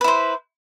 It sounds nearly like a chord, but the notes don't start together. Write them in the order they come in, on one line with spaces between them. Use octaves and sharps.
B4 E4 C5